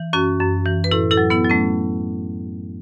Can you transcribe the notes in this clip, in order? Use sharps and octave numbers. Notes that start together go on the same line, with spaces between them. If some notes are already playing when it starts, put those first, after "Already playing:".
Already playing: E3
F#2 C#4 F#4
F#2
E3
B4
A2 E4 A4
E4 A4
F#3
B3 E4
F#3
A3 C#4